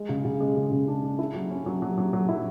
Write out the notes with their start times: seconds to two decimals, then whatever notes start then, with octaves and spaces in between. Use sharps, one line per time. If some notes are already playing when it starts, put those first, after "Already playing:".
Already playing: G#3
0.09 C#3
0.25 C#3
0.40 G#3
0.56 C#3
0.72 C#3
0.88 D4
1.03 D4
1.19 E4
1.34 F#3
1.50 C#4
1.66 F#3
1.82 F#3
1.97 F#3
2.13 F#3
2.29 E4